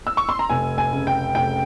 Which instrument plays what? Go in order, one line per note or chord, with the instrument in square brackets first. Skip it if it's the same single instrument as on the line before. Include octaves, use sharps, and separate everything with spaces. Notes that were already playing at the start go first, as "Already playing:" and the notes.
[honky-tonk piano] E6
C#6
C6
A#5
F1 G#5
G#5
C#3
G5
F1 G5